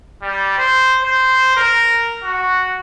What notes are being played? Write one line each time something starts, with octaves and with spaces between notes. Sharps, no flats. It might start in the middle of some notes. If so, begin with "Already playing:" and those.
G3
C5
C5
A#4
F#4